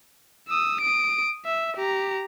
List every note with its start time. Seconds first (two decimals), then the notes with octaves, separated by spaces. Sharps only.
0.48 D#6 E6
0.81 D#6 D7
1.45 E5
1.77 G4 A#5